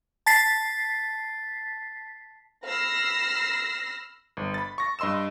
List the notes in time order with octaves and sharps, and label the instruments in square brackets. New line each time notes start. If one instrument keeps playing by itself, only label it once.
[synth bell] A5 A6 B6 C7
[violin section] B5 E6 F6 A#6 C7
[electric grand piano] G1
B5 A6
C#6 A#6
G2 D#5 C6 E6 E7